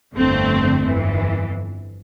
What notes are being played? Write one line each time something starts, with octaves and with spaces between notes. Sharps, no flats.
G1 F2 D3 A3 C4
G1 F2 E3